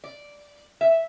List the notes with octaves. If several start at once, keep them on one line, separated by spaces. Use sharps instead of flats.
D5
E5